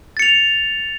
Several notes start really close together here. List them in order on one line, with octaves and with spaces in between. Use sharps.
A6 C#7 F7